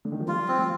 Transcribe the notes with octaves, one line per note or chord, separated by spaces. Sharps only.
D3
D#3
F3
G3 F4
C4
F3